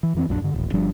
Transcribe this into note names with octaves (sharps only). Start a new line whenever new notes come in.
E3
F2 E3 C4
A#1 F#2 F#3 D4
G2 D3
D#1 A1
G1 F3 G3 D4